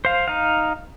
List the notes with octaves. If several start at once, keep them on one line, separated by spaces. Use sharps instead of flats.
C5 F5
D#4 F5